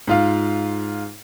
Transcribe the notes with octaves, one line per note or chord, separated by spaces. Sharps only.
G#2 F4 F5